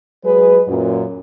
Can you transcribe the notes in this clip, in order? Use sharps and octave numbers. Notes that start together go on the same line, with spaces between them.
F#3 G#3 G#4 B4
F#2 A#2